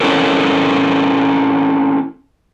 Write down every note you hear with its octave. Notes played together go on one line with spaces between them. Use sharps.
C4 C#4 E4 A4 A#4